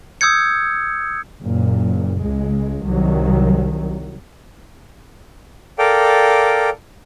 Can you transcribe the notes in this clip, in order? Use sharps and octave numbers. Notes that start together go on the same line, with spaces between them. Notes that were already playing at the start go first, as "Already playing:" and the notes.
D#6 E6 G6 G#6 C#7
F#1 A#2
C#2 G#3
C2 D#3 F#3
A4 A#4 D5 F5 G5 D6